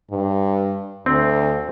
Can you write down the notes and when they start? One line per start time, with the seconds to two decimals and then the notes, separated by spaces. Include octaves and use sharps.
0.11 G2
1.06 D2 C4